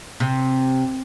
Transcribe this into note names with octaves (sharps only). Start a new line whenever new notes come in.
C3